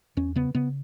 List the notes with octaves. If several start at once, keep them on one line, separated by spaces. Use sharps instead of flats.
E2 C#4
C#3 B3
C#3 B3